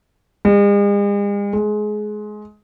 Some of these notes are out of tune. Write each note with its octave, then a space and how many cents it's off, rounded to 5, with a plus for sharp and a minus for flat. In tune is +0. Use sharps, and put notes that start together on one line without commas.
G#3 -45
G#3 +20